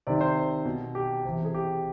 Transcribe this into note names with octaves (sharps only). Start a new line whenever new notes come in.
C3 D#3 D5
C5
B2
G4
C3 E3
G#4
G4